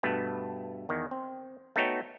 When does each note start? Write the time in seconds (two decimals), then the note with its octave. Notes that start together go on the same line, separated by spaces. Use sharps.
0.03 G2 B2 A3 B3
0.89 E2 D#3
1.11 C4
1.76 A3 B3 D#4 F#4 C#5 G5